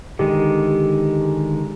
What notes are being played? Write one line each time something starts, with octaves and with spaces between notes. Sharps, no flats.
D3 D#3 G#3 G4